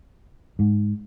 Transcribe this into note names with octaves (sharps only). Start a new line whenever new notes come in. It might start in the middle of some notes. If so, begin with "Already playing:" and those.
G#2